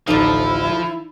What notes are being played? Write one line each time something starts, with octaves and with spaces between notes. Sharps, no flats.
A1 D2 F3 D#4 E4 A4 D5